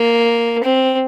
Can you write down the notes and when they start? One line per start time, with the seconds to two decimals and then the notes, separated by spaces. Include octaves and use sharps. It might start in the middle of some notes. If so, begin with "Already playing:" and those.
Already playing: A#3
0.64 C4